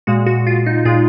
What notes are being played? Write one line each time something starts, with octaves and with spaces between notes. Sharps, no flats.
A#2 G#3 F#4
F#4
F4
D#4
A#2 G#3 F4